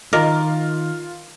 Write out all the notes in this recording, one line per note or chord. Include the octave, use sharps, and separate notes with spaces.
D#3 F4 A#4 D#5 D6